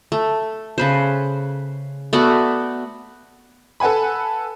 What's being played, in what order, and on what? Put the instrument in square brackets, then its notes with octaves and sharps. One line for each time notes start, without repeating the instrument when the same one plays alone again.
[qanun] A3
C#3 B4 C5
A3 B3 F#4 D5
[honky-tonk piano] A4 B4 F#5 G#5 B5